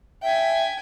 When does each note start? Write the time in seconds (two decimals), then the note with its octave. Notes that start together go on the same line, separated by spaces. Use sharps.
0.22 E5 G5 G#5